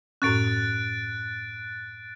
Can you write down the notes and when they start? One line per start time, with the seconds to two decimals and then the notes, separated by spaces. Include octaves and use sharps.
0.22 F#2 A2 C#4 F#6 A6 D7